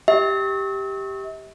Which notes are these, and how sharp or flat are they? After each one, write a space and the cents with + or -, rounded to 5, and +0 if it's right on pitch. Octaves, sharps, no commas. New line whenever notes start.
G4 +0 E5 -40